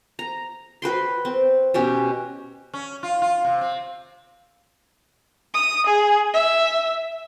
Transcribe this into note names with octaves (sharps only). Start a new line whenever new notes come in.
A#5
F#4 B4 G5 C6
C4
B2 C#4 G4
C#4
F4
F4
C3
C4
D#6
G#4
E5